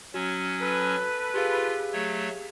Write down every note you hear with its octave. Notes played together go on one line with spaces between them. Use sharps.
F#3 C#4 F#4
A4 B4
F4 G4 G#4 F5
F#3 A3 C#5